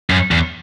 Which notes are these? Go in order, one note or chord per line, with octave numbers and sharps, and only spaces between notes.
F#2
E2